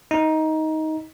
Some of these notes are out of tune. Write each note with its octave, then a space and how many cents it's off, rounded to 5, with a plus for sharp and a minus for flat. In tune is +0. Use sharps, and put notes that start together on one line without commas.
D#4 +15